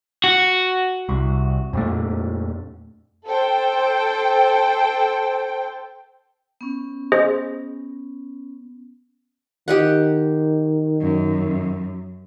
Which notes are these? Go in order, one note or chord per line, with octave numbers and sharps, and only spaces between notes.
F#4
C2
F2 A#2 A3
A4 C5 G5
B3 C#4
G#4 C5 D#5
D#3 G4 D#5 F#5
F#2